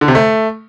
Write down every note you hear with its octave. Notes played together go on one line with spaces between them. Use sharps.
D3
C3
A3